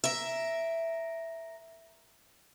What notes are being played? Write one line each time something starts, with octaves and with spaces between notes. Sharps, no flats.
A#4 E5